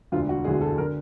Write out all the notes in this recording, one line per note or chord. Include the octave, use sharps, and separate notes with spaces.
E1 D2 D3 F4
F#4
E1 D2 D3 G#4
A4
D3 A#4